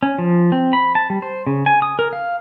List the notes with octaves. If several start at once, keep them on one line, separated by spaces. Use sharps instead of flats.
C#4
F3
C4
B5
A5
G3
C5
C#3
G#5
D#6
A#4
F5